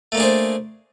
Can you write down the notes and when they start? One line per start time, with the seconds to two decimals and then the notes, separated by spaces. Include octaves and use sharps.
0.12 A3
0.15 A#3
0.17 D4
0.20 G#4
0.23 C5